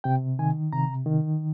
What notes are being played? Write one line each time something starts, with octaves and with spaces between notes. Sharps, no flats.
C3 G5
D#3 G#5
C3 A#5
D#3